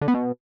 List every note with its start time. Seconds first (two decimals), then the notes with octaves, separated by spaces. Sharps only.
0.01 D3
0.08 B3
0.14 B2